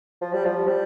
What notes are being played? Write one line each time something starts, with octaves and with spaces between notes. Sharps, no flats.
F3
G3
F3
G3